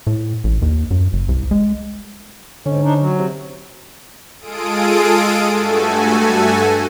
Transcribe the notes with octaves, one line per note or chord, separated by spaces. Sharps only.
A2
A1
D#2
F#2
F#1
C2
G#3
G#2 D3 C#4
D4 D#4
F#3
C3
G#3 F4 G#4 A4 D#6 D7
G2 A3 F#4 A4 G#5